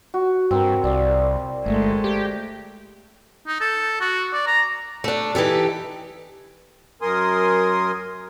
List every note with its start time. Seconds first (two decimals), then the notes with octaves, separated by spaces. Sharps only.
0.14 F#4
0.51 G2 C4 A#4
0.84 C2 D5 F5
1.66 G1 G#3 A3
2.04 G4
3.47 D#4
3.61 A4
4.01 F#4
4.32 D5
4.46 A#5
5.04 A3 D4
5.35 E3 D#4 G4 A4
7.02 F#2 A#4 G#5 C6 D#6